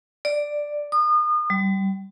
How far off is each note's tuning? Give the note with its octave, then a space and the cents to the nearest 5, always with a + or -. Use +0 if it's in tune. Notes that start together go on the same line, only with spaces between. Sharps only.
D5 +5
D#6 -35
G3 -20